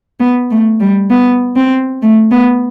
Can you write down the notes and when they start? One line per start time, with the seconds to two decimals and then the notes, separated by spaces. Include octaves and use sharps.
0.20 B3
0.51 A3
0.81 G3
1.10 B3
1.56 C4
2.02 A3
2.31 B3